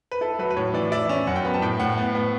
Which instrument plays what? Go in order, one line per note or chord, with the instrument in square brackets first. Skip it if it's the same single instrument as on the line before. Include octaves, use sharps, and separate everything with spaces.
[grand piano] B4
E4 A4
F#3 B4
B4
A2 C#5
E3 D5
E4 D5
C#4
F#2 F#5
G5
B3 B5
A5
A2 G5
A2 F#5
B3
B3